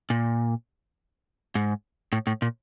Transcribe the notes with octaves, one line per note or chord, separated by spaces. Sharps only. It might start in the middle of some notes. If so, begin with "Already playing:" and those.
A#2
G#2
A2
A2
A#2